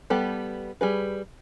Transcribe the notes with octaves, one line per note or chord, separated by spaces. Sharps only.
G3 B3 G4 A4
G3 G#4 B4